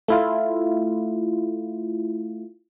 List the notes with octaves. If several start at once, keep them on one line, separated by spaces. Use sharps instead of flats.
A3 E4 F4